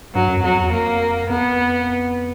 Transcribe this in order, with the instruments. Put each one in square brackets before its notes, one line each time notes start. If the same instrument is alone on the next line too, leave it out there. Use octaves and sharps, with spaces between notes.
[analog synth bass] G2 [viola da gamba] F#3
[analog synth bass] F#2
[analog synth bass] F2 [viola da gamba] F#3
[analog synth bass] E2
[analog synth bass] F2 [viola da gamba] A#3
[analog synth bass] F2 [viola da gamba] B3